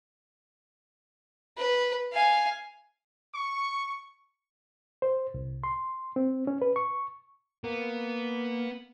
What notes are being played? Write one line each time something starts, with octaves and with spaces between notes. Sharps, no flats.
B4
F5 G#5
C#6
C5
C2
C6
C4
C#4
B4
C#6
A#3 B3